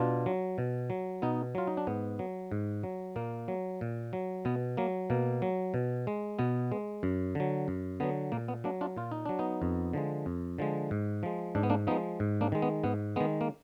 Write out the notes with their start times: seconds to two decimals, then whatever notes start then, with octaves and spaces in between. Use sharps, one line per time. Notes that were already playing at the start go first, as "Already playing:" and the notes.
Already playing: B2 D4 F4
0.26 F#3
0.58 B2
0.90 F#3
1.22 B2 B3 D#4
1.55 F#3 F4
1.67 D#4
1.77 D4
1.87 G#2 B3
2.19 F#3
2.51 G#2
2.83 F#3
3.16 A#2 A#3
3.48 F#3
3.81 A#2
4.13 F#3
4.45 B2 B3
4.77 F#3 A#3
5.10 B2 A#3
5.42 F#3
5.74 B2
6.07 G#3
6.39 B2 B3
6.72 G#3
7.03 F#2
7.35 D3 F#3
7.68 F#2
8.00 D3 F#3 B3
8.32 A#2 A#3
8.48 B3
8.64 F#3 A#3 D4
8.81 D4 F4
8.96 A#2 F4
9.12 D#4
9.26 F#3 D4
9.39 B3 D#4
9.62 F2
9.93 D3 F3 G#3
10.26 F2
10.58 D3 F3 G#3
10.91 G#2
11.23 F3 G#3
11.55 G#2 D4
11.63 B3
11.70 A#3 D4
11.87 F3 G#3 B3 D#4
12.20 G#2
12.41 A#3 D4
12.52 D#3 G#3
12.62 B3
12.84 G#2 B3
13.16 D#3 G#3 B3
13.41 A#3